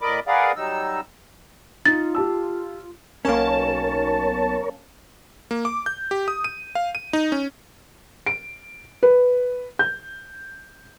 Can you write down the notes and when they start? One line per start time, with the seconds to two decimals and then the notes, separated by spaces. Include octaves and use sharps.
0.01 A2 A#4 D5 D#5 B5 D6
0.27 G#4 A#4 B4 D5 F5 F#5
0.56 F#3 G3 D#4 E6
1.86 D#4 F4 A6
2.15 G4 A5 E6
3.25 B1 A#3 C#4 A#4 C#5 A5
5.51 A#3
5.65 D6
5.86 G6
6.11 G4
6.28 D#6
6.44 D#7
6.75 F5
6.95 D#7
7.13 D#4
7.32 C#4
8.26 D7
9.03 B4
9.79 G6